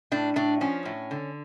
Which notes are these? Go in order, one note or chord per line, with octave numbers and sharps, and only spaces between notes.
A2 D4
A2 D4
F3 C#4
A2
D3